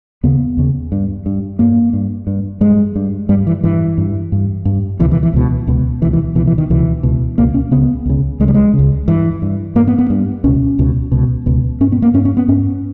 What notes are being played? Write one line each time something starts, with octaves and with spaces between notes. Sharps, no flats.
D#2 C#3 B3
D#2 C#3
G2
G2
G2 A#3
G2
G2
G2 G#3
G2
G2 G3
E3
G2 E3
G2
G2
G2
C#2 B2 E3
E3
E3
C#2 B2
C#2 B2
C#2 B2 E3
E3
C#2 B2 E3
E3
D#3
C#2 B2 E3
C#2 B2
C#2 B2 A#3
C#4
C#2 C#3 B3
C#2 C#3
C#2 C#3 G3 G#3
G#3
C#3
C#2
G2 E3
G2
G2 A#3
B3
B3
G2
C#2 B2 C#4
C#2 B2
C#2 B2
C#2 B2
G2 C#4
B3
A#3
G2 C#4
C#4
B3
G2 C#4